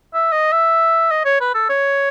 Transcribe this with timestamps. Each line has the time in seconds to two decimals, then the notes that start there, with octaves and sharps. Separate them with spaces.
0.14 E5
0.32 D#5
0.52 E5
1.11 D#5
1.25 C#5
1.41 B4
1.55 A4
1.70 C#5